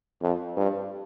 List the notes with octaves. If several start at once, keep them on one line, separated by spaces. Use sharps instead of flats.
F2
G2